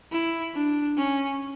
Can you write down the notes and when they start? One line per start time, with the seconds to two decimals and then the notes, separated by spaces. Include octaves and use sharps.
0.12 E4
0.54 D4
0.97 C#4